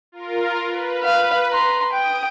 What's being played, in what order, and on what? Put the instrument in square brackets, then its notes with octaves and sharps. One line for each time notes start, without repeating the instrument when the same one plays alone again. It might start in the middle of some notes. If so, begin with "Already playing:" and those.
[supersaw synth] F4 A#4
B4
[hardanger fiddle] F5
A#5 C6
[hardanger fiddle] G5 [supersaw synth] D#6 D7